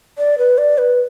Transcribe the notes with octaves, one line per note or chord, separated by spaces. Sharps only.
D5
B4
D5
B4